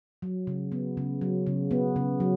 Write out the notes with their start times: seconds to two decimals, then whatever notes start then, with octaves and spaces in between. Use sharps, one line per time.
0.22 F#3
0.47 C#3
0.72 B3
0.97 C#3
1.21 F#3
1.47 C#3
1.71 B3
1.96 C#3
2.20 F#3